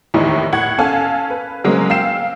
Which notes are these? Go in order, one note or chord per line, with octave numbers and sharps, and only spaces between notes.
F1 D#2 A2 E3 D#4 E4
A2 F#5 G#6
C#4 A4 F5 G#5 A5
B4
C#3 F#3 G#3 A#3 C4 C#4
F5 G5 E6 C7 E7